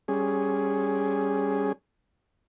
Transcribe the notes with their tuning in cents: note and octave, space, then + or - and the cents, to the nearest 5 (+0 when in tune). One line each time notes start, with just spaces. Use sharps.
G3 +0 C#4 +0 G#4 +0